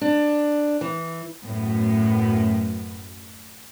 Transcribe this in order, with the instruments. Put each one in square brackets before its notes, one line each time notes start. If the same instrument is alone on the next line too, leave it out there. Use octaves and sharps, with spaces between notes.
[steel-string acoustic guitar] D4
E3
[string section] F#2 A2 B3